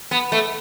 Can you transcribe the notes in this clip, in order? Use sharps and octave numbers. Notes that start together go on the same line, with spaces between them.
B3
A3